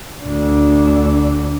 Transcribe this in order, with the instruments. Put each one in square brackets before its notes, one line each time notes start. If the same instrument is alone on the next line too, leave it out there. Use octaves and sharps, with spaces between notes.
[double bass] D2 D4